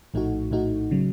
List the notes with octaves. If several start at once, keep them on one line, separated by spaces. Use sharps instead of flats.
A#1 A2 A3 D#4 F#4
A#1 A2 A3 D#4 F#4
C#3 F#3